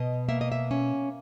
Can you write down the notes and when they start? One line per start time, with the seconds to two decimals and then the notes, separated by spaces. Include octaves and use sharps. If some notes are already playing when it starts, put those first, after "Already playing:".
Already playing: B2 D#5
0.29 A#3 E5
0.41 D#5
0.52 E5
0.71 C#4